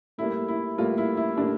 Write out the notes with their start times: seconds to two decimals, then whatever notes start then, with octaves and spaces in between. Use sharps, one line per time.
0.18 A2 G3 A#3 E4
0.48 E4
0.78 A2 G3 A#3 F4
0.98 E4
1.17 E4
1.37 A2 G3 A#3 D4